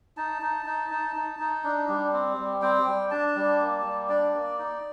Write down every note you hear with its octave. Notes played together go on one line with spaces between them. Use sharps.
D#4 A5
D#4
D#4
D#4
D#4
D#4
D4
G3
C4
G3
C4 G5
G3
D4 A5
G3
A#3
G3
D4 D5
A#3
D#4